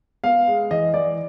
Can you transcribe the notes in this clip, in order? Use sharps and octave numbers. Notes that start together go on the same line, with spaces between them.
B3 F5
G#3
E3 D#5
E3 D5